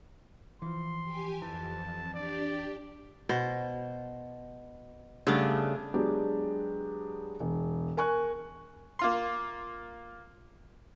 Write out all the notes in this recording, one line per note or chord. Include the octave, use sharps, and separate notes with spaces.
E3 F3 C6
G4 G#5
F2 E3 A5
D4 G4 D5
B2 C5
G2 C#3 A3 B3 D4
F#3 G#3 B3 D4 G4
E1
A#4 G#5 C#6 F#6
A#3 F4 C6